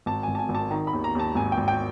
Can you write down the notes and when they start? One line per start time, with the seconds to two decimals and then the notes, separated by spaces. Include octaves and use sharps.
0.06 G#1 A5
0.23 G#1 G#5
0.35 A5
0.39 G#5
0.49 G#1
0.55 A5
0.71 D#3 A#5
0.87 B5
0.93 D#2
1.04 A#5
1.15 D#2 A5
1.35 G#1 G#5
1.52 G5
1.58 G#1
1.68 G5